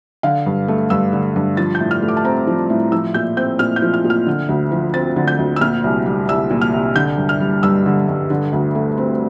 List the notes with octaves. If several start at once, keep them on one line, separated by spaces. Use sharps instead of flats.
D3 F5
G2
A3
G2 E6
D3
G2
F3 A6
G6
A2
F6
A3
D6
A5
C4 A#5
F3
A2
F3 E6
A#2 G6
C4 G6
A#2 F6
G6
F3
F6
A#2
F6
D3
D2
F3
C4 A6
D3
G6
D2
E6
A#2 F6
C2
G3
C2 E6
A#2
F6
C2
D3 G6
G2
F6
G3
G2 E6
D3
G2
D3
D2
A3
C4